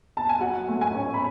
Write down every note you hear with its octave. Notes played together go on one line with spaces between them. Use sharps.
A5
G#5
F#3 F#5
A3
G#5
C#4
B5